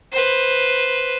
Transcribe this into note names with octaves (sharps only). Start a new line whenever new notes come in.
B4 C5